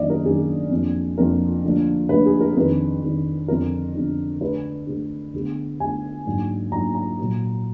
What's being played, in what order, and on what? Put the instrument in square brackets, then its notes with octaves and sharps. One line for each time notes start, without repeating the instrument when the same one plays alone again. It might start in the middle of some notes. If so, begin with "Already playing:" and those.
Already playing: [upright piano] F#2 D#3 A#3 D4 D5 D#5
A#4
F#2 D#3 A#3 D4 G#4
F2 F3 A#3 D4
F2 F3 A#3 D4 A#4
D2 D3 F3 A#3 D4
D2 D3 F3 A#3 D4 B4
G#4
A#4
F2 D#3 G#3 D4 B4
F2 D#3 G#3 D4
F2 D3 G#3 D4 A#4
F2 D3 G#3 D4
D2 D3 G#3 D4 B4
D2 D3 G#3 D4
D2 D3 G#3 B3
D2 D3 G#3 B3 G#5
G#2 F#3 A#3 D4
G#2 F#3 A#3 D4 A#5
A#5
A#2 F#3 A#3